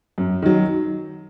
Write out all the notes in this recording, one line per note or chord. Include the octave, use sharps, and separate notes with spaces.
F#2
D#3 F#3